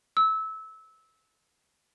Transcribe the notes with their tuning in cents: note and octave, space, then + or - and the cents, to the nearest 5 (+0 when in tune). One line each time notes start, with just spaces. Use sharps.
E6 -20